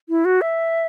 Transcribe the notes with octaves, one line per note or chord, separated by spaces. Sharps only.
E4
F#4
E5